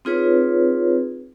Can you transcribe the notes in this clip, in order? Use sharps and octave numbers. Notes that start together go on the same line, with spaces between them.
C4 D#4 F4 G#4 B4 C#5